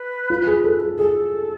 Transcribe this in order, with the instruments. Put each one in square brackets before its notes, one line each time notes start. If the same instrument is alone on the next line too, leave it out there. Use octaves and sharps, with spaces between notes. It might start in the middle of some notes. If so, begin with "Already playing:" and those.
Already playing: [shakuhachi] B4
[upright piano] F4
G#4
A4
G#4
[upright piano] G#4 [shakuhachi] A4